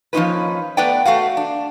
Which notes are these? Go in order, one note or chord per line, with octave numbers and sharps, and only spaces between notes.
F3 A#3 C#4 D#4 F4 B4
A3 B3 B4 D5 F#5 G5
A3 F#4 F5 F#5
D4